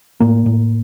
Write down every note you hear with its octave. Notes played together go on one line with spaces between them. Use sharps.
A2 A#3
A2